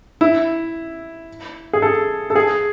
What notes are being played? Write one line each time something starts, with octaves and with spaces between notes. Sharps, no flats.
E4
G#4
A4
A4
G#4